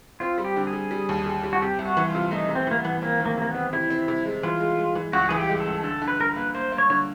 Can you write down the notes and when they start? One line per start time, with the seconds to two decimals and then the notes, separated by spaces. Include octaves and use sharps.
0.20 C4 F4
0.38 G3
0.44 G4
0.56 D3
0.67 G#4
0.73 G3
0.91 G3
1.09 D#2
1.26 G3
1.43 G3
1.53 F#4
1.61 C3 G4
1.79 C2
1.85 F#4
1.97 E3
2.09 F4
2.15 C3
2.31 A3 D#4
2.49 C3
2.55 C4
2.67 E3 A#3
2.79 B3
2.85 E3
3.02 A#3 C4
3.20 D#3
3.25 A#3
3.37 C3 A#3
3.49 B3
3.55 C4
3.73 C3 E4
3.90 C4
4.08 C3
4.25 G#3
4.43 E3 F4
4.61 G#3
4.78 G#3
4.95 E3
5.13 C#2 F#4
5.29 E3 G#4
5.36 G4
5.49 G#3
5.60 A4
5.66 C#2
5.84 D3 A4
6.02 D3
6.08 B4
6.20 D3 A#4
6.31 B4
6.36 A#3
6.55 A#3 C5
6.72 A#3
6.78 C#5
6.90 D3 C#5